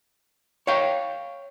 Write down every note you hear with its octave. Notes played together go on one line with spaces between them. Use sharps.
C#5 F5 G5